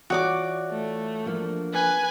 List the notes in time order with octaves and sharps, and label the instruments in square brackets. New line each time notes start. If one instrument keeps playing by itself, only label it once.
[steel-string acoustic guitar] E3 F4 C#5 [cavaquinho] F#4 D5 D6
[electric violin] A3
[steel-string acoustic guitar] F3 A#3 D4
[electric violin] B4 G#5